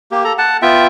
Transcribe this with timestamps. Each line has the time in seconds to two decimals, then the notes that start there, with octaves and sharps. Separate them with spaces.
0.11 A#3 G4
0.24 A4 A#5
0.38 F#5 A5
0.62 B3 F4 E5 G5